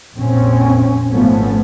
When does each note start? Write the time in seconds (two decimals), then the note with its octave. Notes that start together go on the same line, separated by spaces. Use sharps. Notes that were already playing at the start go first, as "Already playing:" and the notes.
0.15 A#1 F2 C4 C#4
1.09 G#1 F3 A3 B3 C#4